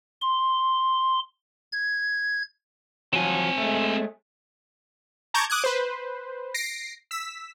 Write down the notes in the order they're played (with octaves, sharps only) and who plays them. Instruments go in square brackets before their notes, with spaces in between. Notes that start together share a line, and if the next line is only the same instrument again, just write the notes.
[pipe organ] C6
G#6
[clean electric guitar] F3 F#3 [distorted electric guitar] C4 G#5
[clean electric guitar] G#3 A3
[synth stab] A5 A#5 C#6 D6 G6 G#6
D6 D#6 F#6 G#6
B4 C5
A#6 C7 D7
E6 B6